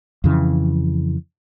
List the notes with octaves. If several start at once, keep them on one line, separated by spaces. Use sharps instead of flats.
F2 C#3 E3